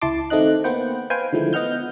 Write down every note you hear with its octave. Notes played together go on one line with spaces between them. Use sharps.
C#2 E4 A5 C6 D6
D#3 A3 C4 D#4 D#5 F#6
A#3 B3 B4 C5 F#5 G5
B4 C5 F5 G5 G#5
D3 D#3 F3 G#3 A3 E4
B3 D#5 F#5 F6 G6